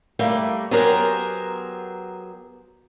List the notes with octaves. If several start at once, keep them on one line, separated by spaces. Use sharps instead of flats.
G3 A3 A#3
F#3 B3 G4 G#4 A#4 C5